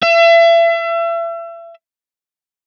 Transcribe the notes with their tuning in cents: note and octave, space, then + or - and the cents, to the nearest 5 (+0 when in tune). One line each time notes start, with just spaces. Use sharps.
E5 +35